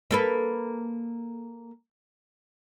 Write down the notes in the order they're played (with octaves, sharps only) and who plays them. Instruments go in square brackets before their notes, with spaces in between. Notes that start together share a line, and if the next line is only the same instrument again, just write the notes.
[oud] A#3 A4 B4